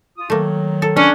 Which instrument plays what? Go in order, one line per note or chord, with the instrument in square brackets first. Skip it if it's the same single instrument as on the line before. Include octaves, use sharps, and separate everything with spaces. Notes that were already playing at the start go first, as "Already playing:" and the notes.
[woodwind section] F4 D#6
[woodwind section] D#3 F#3 [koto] A3 A#3
[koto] A4
[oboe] C#4 [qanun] D4